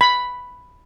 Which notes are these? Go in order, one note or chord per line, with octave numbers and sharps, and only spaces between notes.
B5